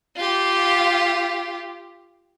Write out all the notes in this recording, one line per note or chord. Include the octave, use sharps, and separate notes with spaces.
F4 G4